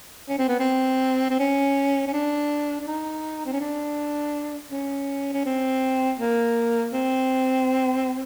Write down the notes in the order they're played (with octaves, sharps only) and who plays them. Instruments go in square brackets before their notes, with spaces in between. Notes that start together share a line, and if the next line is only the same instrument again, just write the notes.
[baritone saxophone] C#4
C4
B3
C4
C4
C#4
C#4
D4
D4
D#4
C4
C#4
D4
C#4
C#4
C4
A#3
C4